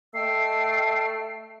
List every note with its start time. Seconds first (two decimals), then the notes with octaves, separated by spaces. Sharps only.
0.14 A3 D#5 G5 E6 C7